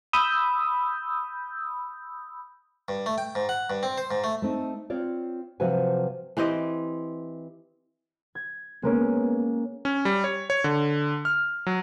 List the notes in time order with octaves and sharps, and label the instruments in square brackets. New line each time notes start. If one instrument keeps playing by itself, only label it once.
[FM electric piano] B5 D#6 E6 G6
[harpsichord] G2
A3
G5
G#2
F#5
G2
C4
C5
G#2
A3
[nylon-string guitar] A3 C4 D#4
C4 F4 C#5 D5
C3 F3 F#3 F#4 B4 G#5
[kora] E3 C4 G4 D#5
[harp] G#6
[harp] G#3 A#3 C#4 [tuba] B3
[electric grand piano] C#4
G3
C#5
C#5
D3
F6
F#3